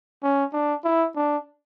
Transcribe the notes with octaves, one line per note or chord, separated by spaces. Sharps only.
C#4
D4
E4
D4